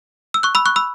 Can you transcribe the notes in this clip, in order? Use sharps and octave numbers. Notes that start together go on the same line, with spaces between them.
E6
C#6 F#6
B5 E6
C#6 F#6
B5 E6